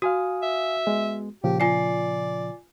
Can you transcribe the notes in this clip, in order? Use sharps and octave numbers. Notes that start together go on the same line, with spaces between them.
F#4 F5 G#5 D#6
E5
G#3 B3
A#2 C#3 F3 G4
F4 D5 G#5 C7